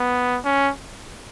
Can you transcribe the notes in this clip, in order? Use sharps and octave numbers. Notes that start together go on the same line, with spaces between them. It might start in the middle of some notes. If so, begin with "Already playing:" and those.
Already playing: B3
C#4